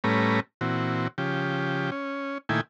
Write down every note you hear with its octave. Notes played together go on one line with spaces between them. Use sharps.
A2 G3 A3 C#4 B4 A#5
A#2 E3 C4 F#4
C#3 F3 G4
C#4
A#2 D#3 A3 E4 G5 G#5